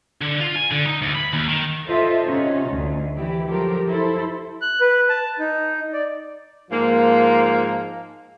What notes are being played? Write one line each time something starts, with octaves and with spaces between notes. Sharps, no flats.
D3
F4
G#5
D3
D#4
D2
B5
D#2
D#3
F4 A4 C5 D#5 E5
C3 C#4 D#4 F4 F#4
D2
E3 E4 G4
F3 F#3 G4 A4 A#4
E4 A4 C5
F#6
B4
A5
D#4
D5
G#2 F3 A#3